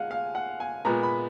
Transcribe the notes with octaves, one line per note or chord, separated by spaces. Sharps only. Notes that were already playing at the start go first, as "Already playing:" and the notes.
Already playing: G#3 F5 F#5 G#5
F5
F#5
G#5
A#2 G#3 B3 A#5
B5